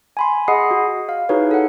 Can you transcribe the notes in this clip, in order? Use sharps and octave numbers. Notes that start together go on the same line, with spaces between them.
G#5 B5 C6
G#4 D#5 F#5 B5 D#6 C7
F#4
F5
D#4 E4 F#4 G#4 B4 C#5
A4 F#5